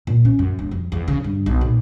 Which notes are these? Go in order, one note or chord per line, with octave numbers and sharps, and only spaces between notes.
A#2
C#4
F#2
E1
F2
E2
C#3
G2
B1
A#2